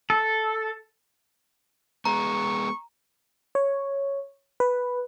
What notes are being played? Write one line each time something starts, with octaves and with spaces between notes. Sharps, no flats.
A4
G#3 B3 A#5 C#6
C#5
B4